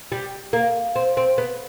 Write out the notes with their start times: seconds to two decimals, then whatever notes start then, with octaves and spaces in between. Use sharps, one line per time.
0.12 G3
0.53 A#3
0.96 C4
1.17 C4
1.38 B3